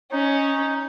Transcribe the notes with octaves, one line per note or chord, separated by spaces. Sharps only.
C#4 D#4